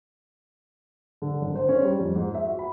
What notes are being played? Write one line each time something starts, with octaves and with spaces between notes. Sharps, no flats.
D3
G#1
C5
C#4
G3
F2
G#2
E5
F#4
B5